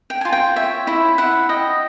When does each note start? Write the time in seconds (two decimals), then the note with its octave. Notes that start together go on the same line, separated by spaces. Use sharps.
0.10 G5
0.21 F4 G#5
0.33 G5
0.56 C#5 E5
0.87 E4 E5
1.18 E4 F#5
1.49 D#5 G5